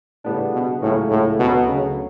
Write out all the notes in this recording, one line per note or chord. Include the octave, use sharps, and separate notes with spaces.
A2 C#3 G3 B3 D4
B2
C#2 A2 C#3 F#3 C#4 F#4
A2
D2 B2 D3 F#3 B3
C#3